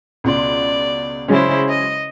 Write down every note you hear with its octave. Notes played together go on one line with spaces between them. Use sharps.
C#2 B2 D5 C6
C#3 F#3 G#3 C#4 E4 C5
D#5